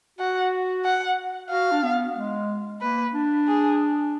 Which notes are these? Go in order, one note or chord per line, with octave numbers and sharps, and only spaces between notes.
F#4 F#5
F#5
F#4 F5
D4
B3
G#3
A#3 B4
D4
G#4